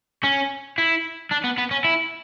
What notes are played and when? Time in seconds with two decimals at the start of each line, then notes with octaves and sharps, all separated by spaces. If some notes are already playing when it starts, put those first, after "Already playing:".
0.24 C#4
0.78 E4
1.31 D4
1.44 B3
1.58 B3
1.71 C#4
1.85 E4